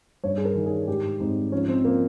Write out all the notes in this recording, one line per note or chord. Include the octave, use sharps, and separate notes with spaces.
G2 C#5
G#4
A#4
D#3
G#4
G#2 G4
G#2 C4
F3 C#4
C4
F3 A#3